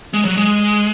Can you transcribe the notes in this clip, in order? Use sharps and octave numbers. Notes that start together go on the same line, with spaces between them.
G#3
F#3
G#3